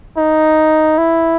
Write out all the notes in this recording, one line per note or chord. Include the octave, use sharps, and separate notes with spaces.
D#4
E4